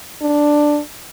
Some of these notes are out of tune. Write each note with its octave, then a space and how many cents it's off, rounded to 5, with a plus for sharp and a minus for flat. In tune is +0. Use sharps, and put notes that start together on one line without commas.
D4 +5